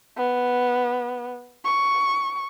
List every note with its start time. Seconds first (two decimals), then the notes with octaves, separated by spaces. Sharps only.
0.17 B3
1.65 C#6